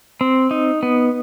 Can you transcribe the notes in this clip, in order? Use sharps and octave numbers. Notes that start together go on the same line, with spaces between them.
C4
D#4
B3